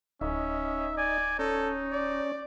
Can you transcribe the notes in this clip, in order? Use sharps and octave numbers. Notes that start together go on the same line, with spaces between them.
D1 C#4 D#4 E5
D5 G#5
C#4 D#4 A4
D5